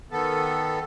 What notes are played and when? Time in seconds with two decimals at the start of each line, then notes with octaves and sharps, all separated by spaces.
0.11 D#3 B3 A4